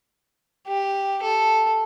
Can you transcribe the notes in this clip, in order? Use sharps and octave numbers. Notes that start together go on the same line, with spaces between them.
G4
A4